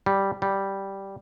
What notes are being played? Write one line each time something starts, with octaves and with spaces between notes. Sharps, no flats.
G3
G3